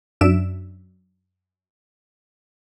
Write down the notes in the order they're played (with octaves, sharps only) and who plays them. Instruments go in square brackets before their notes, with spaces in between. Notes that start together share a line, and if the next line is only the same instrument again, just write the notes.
[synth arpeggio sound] F#2 F#3 D4 E5 D7 E7